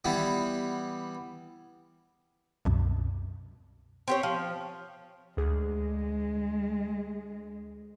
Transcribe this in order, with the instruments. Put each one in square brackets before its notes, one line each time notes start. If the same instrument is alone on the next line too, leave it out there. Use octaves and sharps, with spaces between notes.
[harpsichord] E3 G3 B3
[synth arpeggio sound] C2 F#2 B2
[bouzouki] C4 G4 C#5
F3
[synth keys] D2 G#4 [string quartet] G#3